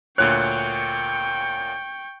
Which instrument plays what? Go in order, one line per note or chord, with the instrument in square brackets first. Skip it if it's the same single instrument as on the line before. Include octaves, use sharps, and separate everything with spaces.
[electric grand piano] D2 A#2 C#5 [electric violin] G5 C#6 [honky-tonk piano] F#6